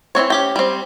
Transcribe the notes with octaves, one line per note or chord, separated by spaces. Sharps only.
E3 F#3 C4 C#5
C#4 G4 G5
G3 C4